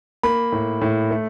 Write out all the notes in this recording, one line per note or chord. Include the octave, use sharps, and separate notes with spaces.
A#3 B5
A2
A2
A3